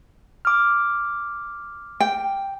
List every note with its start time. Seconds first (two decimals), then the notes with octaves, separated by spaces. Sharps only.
0.45 D6 F6
2.00 G5